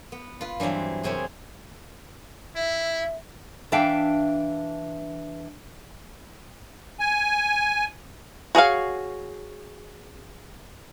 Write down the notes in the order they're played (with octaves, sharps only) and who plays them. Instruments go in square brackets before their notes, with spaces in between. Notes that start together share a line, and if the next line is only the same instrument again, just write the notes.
[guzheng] B3
F4 B4
G2 E3 F#3 C4 F5
F#2 C3 C4 C#4 G#4
[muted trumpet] E4 [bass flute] E5
[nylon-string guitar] E3 D4 E5 F5 G5
[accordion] G#5
[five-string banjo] F#4 G#4 C#5 F5